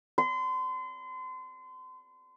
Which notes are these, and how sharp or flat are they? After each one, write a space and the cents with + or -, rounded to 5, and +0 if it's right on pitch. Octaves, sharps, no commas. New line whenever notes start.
C6 -35